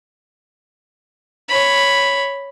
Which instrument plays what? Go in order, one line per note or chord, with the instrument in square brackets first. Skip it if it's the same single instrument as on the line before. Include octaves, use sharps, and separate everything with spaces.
[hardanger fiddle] C#5 B5